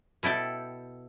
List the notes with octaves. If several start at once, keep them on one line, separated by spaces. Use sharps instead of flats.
B2 E4 A4 G5